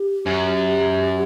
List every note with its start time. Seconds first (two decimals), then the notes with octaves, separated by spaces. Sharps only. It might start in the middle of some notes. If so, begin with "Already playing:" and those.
Already playing: G4
0.26 F#2